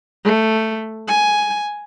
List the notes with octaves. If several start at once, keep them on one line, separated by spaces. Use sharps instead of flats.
A3
G#5